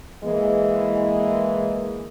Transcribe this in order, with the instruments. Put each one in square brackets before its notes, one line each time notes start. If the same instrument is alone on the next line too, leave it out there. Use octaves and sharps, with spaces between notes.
[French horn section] E3 G#3 A#3